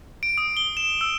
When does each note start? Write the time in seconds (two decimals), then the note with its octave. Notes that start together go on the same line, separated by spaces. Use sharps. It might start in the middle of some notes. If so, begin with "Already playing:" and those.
0.23 D7
0.38 D#6
0.57 G7
0.77 E7
1.01 E6